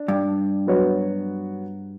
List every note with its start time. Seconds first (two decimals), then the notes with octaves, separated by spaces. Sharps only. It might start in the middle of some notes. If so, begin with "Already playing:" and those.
Already playing: D4
0.08 G2
0.67 F#3 B3 F#4 C#5